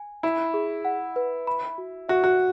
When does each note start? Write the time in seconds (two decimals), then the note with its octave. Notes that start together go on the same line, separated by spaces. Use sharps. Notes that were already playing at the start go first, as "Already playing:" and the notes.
Already playing: G#5
0.23 E4 B5
0.54 G#4
0.85 F#5
1.16 B4
1.47 B5
1.78 F#4
2.09 F#4 E5
2.24 F#4